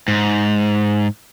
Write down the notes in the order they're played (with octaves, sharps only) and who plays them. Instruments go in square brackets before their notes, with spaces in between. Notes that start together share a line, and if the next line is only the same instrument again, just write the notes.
[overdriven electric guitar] G#2